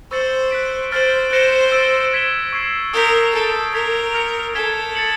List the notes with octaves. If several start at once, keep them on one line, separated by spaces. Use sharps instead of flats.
C5 C#6 E6 A6 C#7 F#7
F#6 B6 D7
C5 F6 A6 D7 F#7
C5 F#6 A#6 C#7 E7 G7
E6 A6 D7 G7
G#6 B6 E7 G7
C#6 E6 G#6 C7 E7
A#4 D#6 G6 B6
A4 A6 D7 G7
A#4 G#6 B6 D7 F7
F6 G#6 C#7 F7
A4 G#6 B6 E7 G7
A6 C#7 F#7